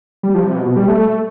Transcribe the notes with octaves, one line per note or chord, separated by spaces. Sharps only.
G3
F3
C3
B2
B2
G3
A3